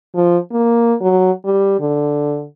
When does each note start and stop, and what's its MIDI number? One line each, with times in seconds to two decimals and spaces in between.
0.15 0.38 53
0.52 0.94 58
1.01 1.31 54
1.45 1.75 55
1.80 2.45 50